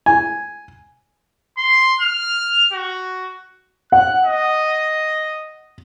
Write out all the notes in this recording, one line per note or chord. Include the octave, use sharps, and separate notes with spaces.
G#5
C6
F6
F#4
F#5 F#6
D#5